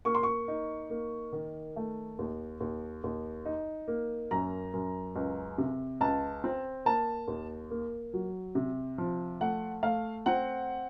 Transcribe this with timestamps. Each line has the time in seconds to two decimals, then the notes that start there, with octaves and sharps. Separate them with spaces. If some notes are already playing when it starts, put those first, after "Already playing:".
0.05 A#3 C#6
0.15 C6
0.23 C#6
0.48 D#4
0.90 A#3
1.33 D#3
1.76 A3
2.19 D#2
2.60 D#2
3.04 D#2
3.46 D#4
3.88 A#3
4.31 F#2 A#5
4.74 F#2
5.16 C#2
5.58 C3
6.01 C#2 A5
6.44 C4
6.85 A#3 A5
7.28 D#2
7.71 A#3
8.14 F#3
8.55 C3
8.98 F3
9.41 A3 F#5
9.83 A3 F5
10.26 C4 F#5